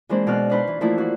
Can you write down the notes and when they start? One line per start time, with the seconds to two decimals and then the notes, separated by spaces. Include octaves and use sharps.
0.09 E3 G#3 A#3 C4 D4 C5
0.27 B2 D5 F6 F#6
0.50 D4 D#4 B4 C5
0.67 E3
0.81 E3 F3 A3 A#3 D4 E4
0.98 D4 F#4